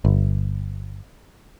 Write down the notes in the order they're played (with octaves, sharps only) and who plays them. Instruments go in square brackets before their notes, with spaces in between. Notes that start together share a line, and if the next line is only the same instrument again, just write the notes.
[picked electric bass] G1